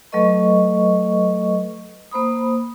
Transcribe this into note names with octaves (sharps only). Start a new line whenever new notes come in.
F#3 A3 A4 B4 D#5 C#6
A#3 C5 B5 D#6